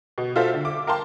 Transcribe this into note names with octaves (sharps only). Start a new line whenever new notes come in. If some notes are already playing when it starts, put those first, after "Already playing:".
B2
F4 F#4 A4 C5 E5 F5
D3
D6
A#4 F5 G5 A5 C6